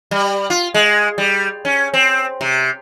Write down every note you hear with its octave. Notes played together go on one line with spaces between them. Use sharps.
G3
F4
G#3
G3
C#4
C4
C3